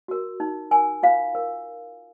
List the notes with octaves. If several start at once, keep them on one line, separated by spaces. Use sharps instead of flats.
F#4 A#4
D#4
A#4 G#5
F4 F5
A#4